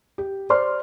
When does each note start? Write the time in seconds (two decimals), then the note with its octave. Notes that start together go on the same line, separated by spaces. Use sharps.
0.18 G4
0.50 C5 D5 C6 F6